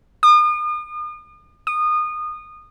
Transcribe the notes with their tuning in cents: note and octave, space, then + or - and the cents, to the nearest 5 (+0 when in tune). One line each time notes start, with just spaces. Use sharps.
D#6 -40
D#6 -25